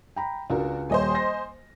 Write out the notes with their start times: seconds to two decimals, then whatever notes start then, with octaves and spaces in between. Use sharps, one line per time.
0.16 G5 A#5 B5
0.50 C#2 D4 F#4 A#4
0.90 D#1 C5 C#5 D#5 G#5
1.11 C6 A#6